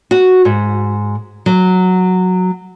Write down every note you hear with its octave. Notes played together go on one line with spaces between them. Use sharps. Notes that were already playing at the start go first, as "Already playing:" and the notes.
F#4
G#2
F#3